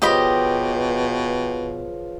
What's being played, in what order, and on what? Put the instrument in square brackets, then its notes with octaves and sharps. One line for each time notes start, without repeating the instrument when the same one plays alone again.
[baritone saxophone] B2 [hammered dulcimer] F3 [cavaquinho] G4 D#5 B5 [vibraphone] G#4 B4 C#5